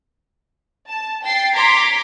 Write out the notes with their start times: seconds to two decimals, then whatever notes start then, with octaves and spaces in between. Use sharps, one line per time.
0.88 A5
1.25 G5 A6 C7
1.55 A#5 C6 D6 G#6 B6